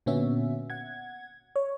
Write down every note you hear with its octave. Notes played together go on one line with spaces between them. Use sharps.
A#2 D3 B3 C#4 F#4 E5
F#5 G#6
C#5